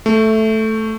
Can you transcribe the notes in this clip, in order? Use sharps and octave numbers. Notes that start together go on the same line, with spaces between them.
A3